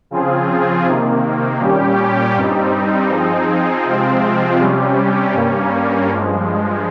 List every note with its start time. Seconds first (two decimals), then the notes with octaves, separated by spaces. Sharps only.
0.11 C#3 F3 C4 F4 G#4
0.85 C3 D#3 A#3
1.60 A#2 G3 C#4 G4
2.35 G2 G3 C4 D#4
3.09 F3 C4 D#4 G#4
3.84 C3 F3 G#3 C4 F4
4.59 C3 G3 C#4 G4
5.34 G2 G3 A#3 C#4
6.09 G2 F3 G#3